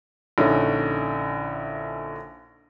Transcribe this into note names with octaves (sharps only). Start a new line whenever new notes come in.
A#1 D3 C#4 D#4 E4